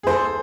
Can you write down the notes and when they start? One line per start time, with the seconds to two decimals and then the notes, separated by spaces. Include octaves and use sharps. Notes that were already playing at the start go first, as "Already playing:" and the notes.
0.03 G#4
0.07 C5
0.10 A4